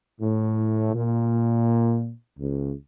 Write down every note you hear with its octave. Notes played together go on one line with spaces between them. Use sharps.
A2
A#2
C#2